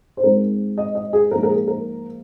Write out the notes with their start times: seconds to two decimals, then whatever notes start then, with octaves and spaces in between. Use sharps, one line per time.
0.17 C5
0.23 G#2 G#3 C4 A#4
0.78 D#5
0.95 D#5
1.13 G#4
1.31 G#2 F3 A#3 A#4
1.43 A#4
1.49 G#4
1.67 A#4